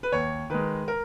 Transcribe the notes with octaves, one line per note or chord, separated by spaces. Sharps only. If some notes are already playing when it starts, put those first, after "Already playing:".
B4
D#2 C#5
D#3 G#3 B4
A#4